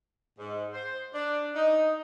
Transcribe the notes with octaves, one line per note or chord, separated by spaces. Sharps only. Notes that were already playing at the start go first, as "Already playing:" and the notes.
G#2
C5
D4
D#4